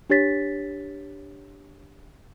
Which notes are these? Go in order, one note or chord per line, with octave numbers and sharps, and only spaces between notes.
D4 G4 C#5 A6 B6